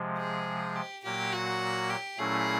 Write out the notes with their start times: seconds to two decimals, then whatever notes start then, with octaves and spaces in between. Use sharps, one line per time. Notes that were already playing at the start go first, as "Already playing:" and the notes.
Already playing: C3 F3 G#3
0.18 G#4
0.76 G4
1.04 A#2 F#3 A#3 G4
1.33 F#4
1.90 G4
2.18 A#2 F#3 A3 C#4 E4 G#4